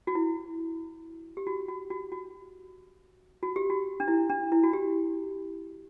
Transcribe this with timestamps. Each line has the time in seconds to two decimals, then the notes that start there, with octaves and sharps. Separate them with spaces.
0.07 F#4
0.15 E4
1.37 G4
1.47 F#4
1.68 F#4
1.90 F#4
2.12 F#4
3.43 F#4
3.56 G4
3.70 F#4
4.00 D4
4.08 E4
4.30 D4
4.52 E4
4.63 F#4
4.73 G4